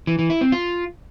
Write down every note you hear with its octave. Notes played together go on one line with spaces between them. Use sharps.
E3
E3
E4
C4
F4